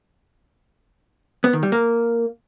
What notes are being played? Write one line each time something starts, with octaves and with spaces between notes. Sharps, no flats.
B3
D#3
G3
A#3